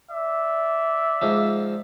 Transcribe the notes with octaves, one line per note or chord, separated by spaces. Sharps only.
D5 E5
G#2 F3